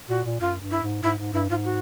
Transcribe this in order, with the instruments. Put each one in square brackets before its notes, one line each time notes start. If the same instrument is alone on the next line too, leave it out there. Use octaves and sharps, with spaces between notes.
[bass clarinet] A#2 [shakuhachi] F#4
[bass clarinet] A#2
[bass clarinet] F#2 [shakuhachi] F4
[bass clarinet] G2
[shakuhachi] E4
[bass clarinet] G#2
[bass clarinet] G#2 [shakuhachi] E4
[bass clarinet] G#2
[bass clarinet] G2 [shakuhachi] E4
[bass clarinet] G#2 [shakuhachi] F4
[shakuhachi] F#4